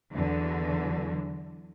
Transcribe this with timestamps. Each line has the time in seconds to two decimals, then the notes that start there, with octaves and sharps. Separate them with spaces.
0.13 E2 D3 F#3